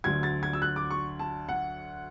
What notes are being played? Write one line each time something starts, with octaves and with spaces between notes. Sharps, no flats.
D2 D3 F#3 G#6
A6
G#6
E6
F#6
D6
C#6
A5
F#5